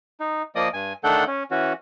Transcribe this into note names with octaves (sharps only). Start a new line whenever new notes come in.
D#4
F3 A#3 D5 D#5 D#6
G2 G#5
D#3 A3 D4 A4 F#5 G6
C#4
E3 C#4 F#4